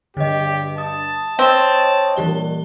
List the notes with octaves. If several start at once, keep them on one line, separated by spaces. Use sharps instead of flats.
G2 D3 G4 D#5
A5 D#6
C4 C#5 D#5
A#2 E3 G3 G4 G7